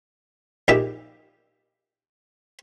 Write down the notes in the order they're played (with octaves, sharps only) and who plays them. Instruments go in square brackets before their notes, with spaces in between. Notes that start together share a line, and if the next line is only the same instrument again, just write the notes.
[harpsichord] A#1 A#2 D#4 G4 E5 G5